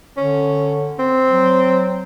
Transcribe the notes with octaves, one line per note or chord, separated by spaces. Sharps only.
D3 C#4
C4
F#3